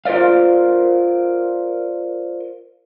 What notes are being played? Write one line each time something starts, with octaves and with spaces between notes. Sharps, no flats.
F4 A#4 C5 D5 F5